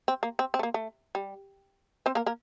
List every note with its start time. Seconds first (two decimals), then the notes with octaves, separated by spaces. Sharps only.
0.08 C4
0.23 A#3
0.39 C4
0.54 C4
0.59 A3
0.63 A#3
0.74 A3
1.15 G3
2.06 C4 C5
2.15 A#3 A#4
2.26 A#3 A#4